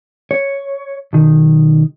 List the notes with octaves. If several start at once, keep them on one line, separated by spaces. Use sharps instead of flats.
C#5
B1 D#3